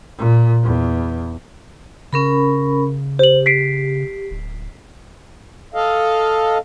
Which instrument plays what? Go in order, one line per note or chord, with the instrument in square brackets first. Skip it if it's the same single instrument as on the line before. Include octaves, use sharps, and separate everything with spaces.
[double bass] A#2
E2
[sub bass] C#3 [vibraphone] C#4 A#4 B5
[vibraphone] G4 [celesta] C5 F#7
[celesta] B6 C7 D7
[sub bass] D1
[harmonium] A4 D#5 F5